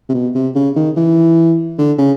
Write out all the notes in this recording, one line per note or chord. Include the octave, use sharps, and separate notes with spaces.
C3
B2
C3
C#3
D#3
E3
D3
C#3